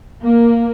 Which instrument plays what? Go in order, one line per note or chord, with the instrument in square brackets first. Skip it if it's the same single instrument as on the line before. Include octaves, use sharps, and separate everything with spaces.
[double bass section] A#3